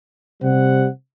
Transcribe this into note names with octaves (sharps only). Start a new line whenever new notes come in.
C3 G3 C5 F#5